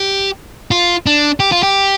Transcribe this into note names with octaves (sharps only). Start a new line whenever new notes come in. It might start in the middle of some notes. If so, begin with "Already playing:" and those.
Already playing: G4
F4
D4
G4
F4
G4